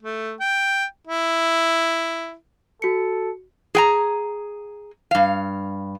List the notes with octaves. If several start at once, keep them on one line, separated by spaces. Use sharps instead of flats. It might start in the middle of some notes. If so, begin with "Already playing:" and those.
A3
G5
E4
F#4 A4 C#7
G#4 G5 A#5
G2 F5